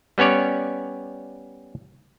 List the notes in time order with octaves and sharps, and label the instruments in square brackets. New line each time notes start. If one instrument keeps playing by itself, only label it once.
[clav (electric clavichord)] G3 B3 C#4 C#5 D5